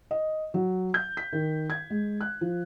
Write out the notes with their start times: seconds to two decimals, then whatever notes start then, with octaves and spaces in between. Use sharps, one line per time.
0.11 D#5
0.54 F#3
0.94 G6
1.17 B6
1.33 D#3
1.70 G#6
1.90 G#3
2.21 F#6
2.41 F3